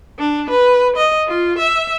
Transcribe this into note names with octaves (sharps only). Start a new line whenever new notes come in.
D4
B4
D#5
F4
E5